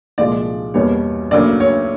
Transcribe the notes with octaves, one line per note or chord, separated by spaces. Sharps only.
C2 A#2 F3 G#3 D5
E2 B2 G3 A#3 C#5
D2 C#3 F#3 A#3 D5
C#5